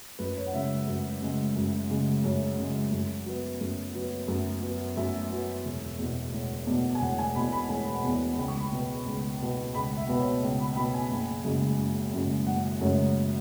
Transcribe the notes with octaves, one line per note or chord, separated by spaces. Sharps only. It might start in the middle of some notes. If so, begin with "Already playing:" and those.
F#2 B4
C#5
F#5
C#3 G#3 E5
F#2
C#3 G#3
F#2
C#3 G#3
F#2 C#5
C#3 G#3
F#2
F#3 B3
F#2
F#3 B3
F#2
F#3 B3
F#2 E5
F#3 B3
E1
E2 B2
E1
E2 B2
G#5
E1 F#5
G#5
E2 B2 B5
B5
E1 G#5
F#5
E2 B2 G#5
C#2 B5
C#6
B5
B2 B3
C#2
B2 B3
C#2 B5
E5
B2 B3
C#5
C#2
B5
B2 B3 B5
G#5
F#1
F#2 C#3 G#3
F#1
F#2 C#3 G#3
F#1 F#5
F#2 C#3 G#3 C#5